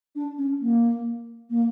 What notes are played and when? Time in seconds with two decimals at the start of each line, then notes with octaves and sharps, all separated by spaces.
0.15 D4
0.38 C#4
0.61 A#3
1.50 A#3